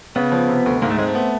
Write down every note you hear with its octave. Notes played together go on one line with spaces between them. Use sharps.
C#3 B3
F3
C3
D2
G#2 A#3
A3
G#3 C4
A3
B3